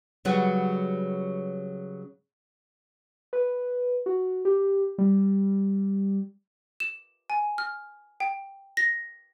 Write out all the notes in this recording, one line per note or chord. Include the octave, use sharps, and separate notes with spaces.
C#3 F#3 G3 F#4 B4
B4
F#4
G4
G3
E7
G#5
F6
G5
A#6